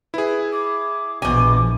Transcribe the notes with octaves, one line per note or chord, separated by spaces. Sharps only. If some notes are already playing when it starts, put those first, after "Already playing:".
E4 G#4 B4
D6
A#1 B2 E3 F3 G#5 D6